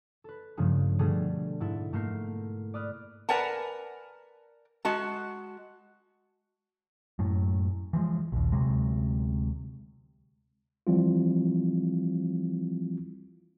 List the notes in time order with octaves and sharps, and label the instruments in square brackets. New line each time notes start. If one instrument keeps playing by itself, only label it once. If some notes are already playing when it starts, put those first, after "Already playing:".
[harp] A4 B4
G2 C#3 F3 G#3 A3
B2 D3 G3 A3 G#4 A4
G#2 E4 A4
G#2 A3 A#3 A#4 G6 C7
D5 B5 D#6 F6 F#6
[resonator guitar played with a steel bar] A#4 B4 D5 F#5 G#5 A5
G#3 F#4 A5
[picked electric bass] F#2 A2
E3 F3 G3 G#3
A#1 D#2
D2 C3 F#3 G#3
[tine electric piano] E3 F3 G3 C4 E4 F4